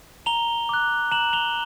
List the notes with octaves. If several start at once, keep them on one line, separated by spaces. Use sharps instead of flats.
A#5 F7 G7
D6 F#6
A#5 E7 F#7
F7 G7